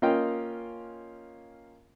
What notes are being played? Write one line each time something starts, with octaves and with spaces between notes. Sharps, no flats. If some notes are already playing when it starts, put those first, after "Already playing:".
A#3 C#4 F4 D#5 F5 G5